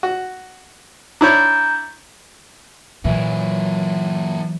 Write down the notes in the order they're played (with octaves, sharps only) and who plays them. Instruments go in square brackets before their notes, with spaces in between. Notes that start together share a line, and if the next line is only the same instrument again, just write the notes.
[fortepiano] F#4
[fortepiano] D4 E4 C#5 [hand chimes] A#5 G6
[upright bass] A#2 [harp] E3 F#3 [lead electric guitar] A#3 E4